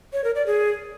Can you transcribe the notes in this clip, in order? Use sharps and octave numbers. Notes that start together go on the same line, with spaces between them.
C#5
A#4
D5
G#4